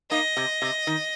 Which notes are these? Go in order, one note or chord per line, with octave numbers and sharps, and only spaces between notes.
A#3 D#4 D#5
C3
C3
D#3